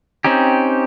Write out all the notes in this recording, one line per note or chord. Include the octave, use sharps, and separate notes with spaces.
C4 C#4 D#4 G4